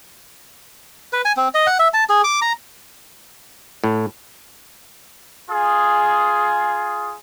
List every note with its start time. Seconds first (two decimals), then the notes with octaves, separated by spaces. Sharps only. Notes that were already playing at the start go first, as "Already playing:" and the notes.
1.13 B4
1.25 G#5
1.37 C4
1.54 D#5
1.67 F#5
1.79 E5
1.94 A5
2.09 G#4
2.24 D6
2.42 A#5
3.84 A2
5.49 F4 G#4